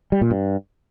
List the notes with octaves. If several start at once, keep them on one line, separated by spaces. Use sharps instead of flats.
G3
A#2
G2